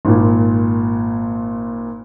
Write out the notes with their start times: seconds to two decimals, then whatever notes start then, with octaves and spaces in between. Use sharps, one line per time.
0.05 G#1 A#2